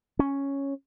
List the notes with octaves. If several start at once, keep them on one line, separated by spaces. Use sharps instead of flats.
C#4